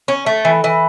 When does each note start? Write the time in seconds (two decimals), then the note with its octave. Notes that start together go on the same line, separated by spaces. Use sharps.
0.08 C#4
0.26 A3
0.45 E3
0.64 E3